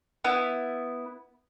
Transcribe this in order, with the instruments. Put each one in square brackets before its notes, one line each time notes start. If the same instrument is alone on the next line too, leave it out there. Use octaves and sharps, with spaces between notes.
[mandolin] B3 E4